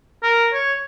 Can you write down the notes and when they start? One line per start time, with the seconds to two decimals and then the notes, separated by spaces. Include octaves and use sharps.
0.23 A#4
0.53 C#5